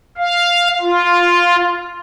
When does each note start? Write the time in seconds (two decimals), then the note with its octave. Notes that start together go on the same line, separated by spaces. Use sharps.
0.17 F5
0.81 F4